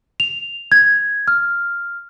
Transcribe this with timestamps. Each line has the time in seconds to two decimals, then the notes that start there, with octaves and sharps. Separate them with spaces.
0.20 F7
0.72 G#6
1.28 F6